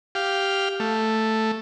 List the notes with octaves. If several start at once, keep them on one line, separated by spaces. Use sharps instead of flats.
G4 F5
A3